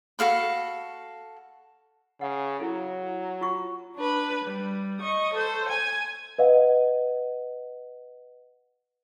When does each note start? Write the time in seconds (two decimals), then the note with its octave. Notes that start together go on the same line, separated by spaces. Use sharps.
0.19 F#4 A4 F5 B5
2.21 C#3 F#5
2.60 F#3 E4 A4
3.41 F4 F#4 C#6
3.96 D4 B4
4.45 G3
5.00 D#5 C#6
5.33 A4 C5
5.68 G#5
6.38 B4 D#5 F5 F#5